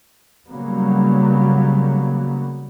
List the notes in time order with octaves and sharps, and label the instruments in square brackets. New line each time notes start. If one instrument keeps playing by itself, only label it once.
[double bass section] C#3 F#3 G3 A#3 B3